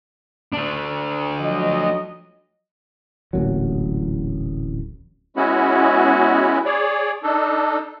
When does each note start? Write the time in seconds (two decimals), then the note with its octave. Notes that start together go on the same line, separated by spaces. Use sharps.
0.53 A3 D4
1.41 F3 F#3 D#5
3.33 D1 A1 A#2 F#3
5.36 G#3 B3 C#4 E4 F#4
6.65 G#4 C#5 D5
7.23 D4 D#4 A4